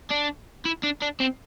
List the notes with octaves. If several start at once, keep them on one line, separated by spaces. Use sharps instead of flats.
D4
E4
D4
D4
C4